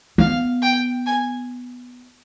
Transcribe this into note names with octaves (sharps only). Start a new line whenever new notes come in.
B3 F5
G5
G#5